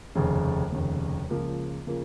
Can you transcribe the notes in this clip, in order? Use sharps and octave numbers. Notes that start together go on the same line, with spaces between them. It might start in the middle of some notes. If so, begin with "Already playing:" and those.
F1 D#2 C#3
F1 D#2 C#3
C#2 C#3 F3 A#3 F4
C#3 F3 A#3 F4